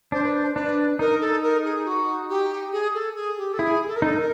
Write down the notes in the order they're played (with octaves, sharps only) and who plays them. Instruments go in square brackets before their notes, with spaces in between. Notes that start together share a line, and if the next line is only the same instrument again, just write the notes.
[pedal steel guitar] D4 [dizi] C5
[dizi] B4
C5
[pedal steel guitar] D4 [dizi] B4
[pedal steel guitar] D#4 [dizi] A#4
[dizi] A4
A#4
G#4
F#4
G4
G#4
A4
G#4
G4
A4
[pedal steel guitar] E4 [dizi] G#4
[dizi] A4
A#4
[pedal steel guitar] D#4 [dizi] A4
[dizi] A#4